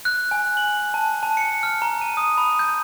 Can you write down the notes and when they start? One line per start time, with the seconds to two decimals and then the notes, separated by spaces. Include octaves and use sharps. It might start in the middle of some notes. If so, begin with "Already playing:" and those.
0.05 F#6
0.31 G#5
0.57 F#7
0.94 A5
1.23 A5
1.37 C#7
1.63 F6
1.82 A#5
2.01 D#7
2.17 D#6
2.37 B5
2.59 G6